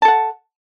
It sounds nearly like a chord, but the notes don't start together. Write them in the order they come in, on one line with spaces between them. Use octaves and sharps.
A5 A4 F#5